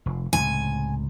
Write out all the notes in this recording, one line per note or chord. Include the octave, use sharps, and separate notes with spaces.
F1
C#2 A2 C3 G#5